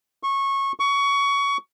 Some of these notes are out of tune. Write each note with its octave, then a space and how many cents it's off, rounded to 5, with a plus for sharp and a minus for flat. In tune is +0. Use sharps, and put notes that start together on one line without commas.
C#6 -20
C#6 +20